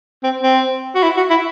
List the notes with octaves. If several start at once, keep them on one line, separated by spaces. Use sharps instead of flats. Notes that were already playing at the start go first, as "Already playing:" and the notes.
C4
C4
F#4
E4
F#4
E4